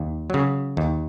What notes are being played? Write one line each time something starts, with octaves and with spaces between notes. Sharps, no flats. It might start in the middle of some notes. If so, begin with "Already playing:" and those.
Already playing: D#2
C#3 F#3
D#2